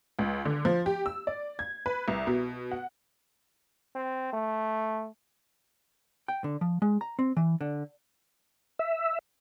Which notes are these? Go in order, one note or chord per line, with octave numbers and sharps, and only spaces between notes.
C#2
D3
F3
G4
E6
D5
G#6
B4
C2
B2
F#5
C4
A3
G5
D3
F3
G#3
A#5
C4
E3
D3
E5